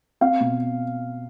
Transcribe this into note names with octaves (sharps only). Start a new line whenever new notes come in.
C4 F5
B2